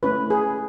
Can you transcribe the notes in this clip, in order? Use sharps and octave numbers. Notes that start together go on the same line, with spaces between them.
A3 C#4 E4 B4
G#4